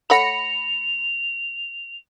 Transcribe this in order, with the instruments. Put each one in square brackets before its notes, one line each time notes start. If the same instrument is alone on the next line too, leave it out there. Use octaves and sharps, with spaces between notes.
[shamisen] A3 C#5 F#5 [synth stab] B5 A#6 C#7 [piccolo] F7